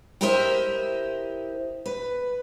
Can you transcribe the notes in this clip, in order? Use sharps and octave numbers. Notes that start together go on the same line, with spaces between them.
E4 G4 A#4 C5 D#5 E5
B4